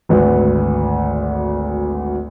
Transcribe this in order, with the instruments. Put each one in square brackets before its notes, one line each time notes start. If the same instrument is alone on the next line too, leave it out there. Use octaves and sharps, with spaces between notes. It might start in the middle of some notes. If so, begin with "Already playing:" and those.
[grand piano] G#1 D2 B4